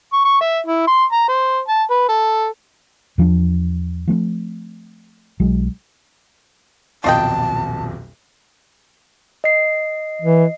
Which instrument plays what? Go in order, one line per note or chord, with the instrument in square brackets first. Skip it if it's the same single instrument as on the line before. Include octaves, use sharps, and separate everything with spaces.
[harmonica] C#6
C#6
E5
E4
C6
A#5
C5
A5
B4
A4
[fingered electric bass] E2 F3 A#3 D4
F3 A3 B3 C4
B1 F#3 G#3
[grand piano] D#1 B1 F2 [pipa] F4 D#5 G5 [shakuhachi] A5
[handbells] D#5 C7
[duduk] E3